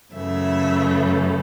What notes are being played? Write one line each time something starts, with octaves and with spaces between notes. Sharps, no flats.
F#2 C#3 E3 A3 E5